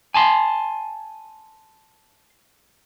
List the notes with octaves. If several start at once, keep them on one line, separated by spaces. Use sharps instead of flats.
G#5 A5 C6